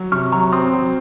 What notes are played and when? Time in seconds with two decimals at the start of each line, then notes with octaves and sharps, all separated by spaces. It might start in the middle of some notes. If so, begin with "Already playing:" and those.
Already playing: F#3
0.12 C3 C#6 F6
0.32 F#3 A#5 C#6
0.52 C4 C6 D#6
0.73 F#3